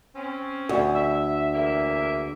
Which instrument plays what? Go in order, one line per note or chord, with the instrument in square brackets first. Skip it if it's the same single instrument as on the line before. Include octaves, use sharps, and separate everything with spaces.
[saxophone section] C4 C#4
[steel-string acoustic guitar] D2
[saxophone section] E5
E2 A#3 E5